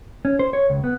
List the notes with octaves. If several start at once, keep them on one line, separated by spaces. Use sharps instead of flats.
C#4
C5
C#5
C#2
B3